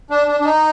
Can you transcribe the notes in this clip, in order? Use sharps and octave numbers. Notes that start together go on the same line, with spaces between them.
D4
D4
D4
D#4